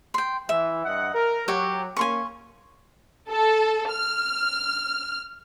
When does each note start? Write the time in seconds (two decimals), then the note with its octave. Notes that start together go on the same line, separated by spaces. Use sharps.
0.14 G5 C6
0.49 E3 E5
0.85 G2 D#5 F#5
1.14 A#4
1.48 F#3 G4 C#5
1.97 A#3 C#4 G#5 C6 C#6
3.29 A4
3.90 F6